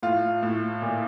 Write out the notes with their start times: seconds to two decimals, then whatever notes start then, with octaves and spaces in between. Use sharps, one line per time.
0.03 A2 F4
0.43 A2
0.82 A#2